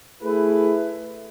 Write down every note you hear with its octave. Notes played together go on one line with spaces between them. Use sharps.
A3 E4 G#4 B4